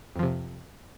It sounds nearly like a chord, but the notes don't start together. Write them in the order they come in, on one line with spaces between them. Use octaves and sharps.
F2 F3 C3